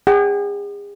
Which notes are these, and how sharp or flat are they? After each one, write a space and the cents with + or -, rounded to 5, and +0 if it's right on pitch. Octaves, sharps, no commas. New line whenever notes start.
G#4 -40 F#5 +35